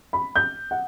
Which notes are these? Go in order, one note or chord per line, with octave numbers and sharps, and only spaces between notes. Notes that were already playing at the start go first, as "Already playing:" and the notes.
B5
G6
F#5